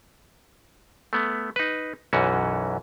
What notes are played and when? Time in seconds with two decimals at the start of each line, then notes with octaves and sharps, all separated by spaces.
1.13 A3 B3
1.56 D#4 B4
2.13 B1 F#2 E3 C#4 F#4